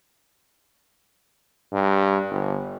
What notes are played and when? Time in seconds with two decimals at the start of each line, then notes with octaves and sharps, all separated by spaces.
1.72 G2
2.30 G1